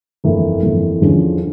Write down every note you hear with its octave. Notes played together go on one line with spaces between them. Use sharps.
G1 F2 E3 A#3
G1 F2 E3 A#3
E2 D3 F3 C#4